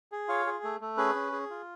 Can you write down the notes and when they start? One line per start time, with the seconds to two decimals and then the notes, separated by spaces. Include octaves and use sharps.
0.12 G#4
0.28 F4 C#5 F5
0.46 G#4
0.64 A3
0.81 A3
0.97 C#4 G#4 B4
1.15 C#4
1.32 G#4
1.50 F4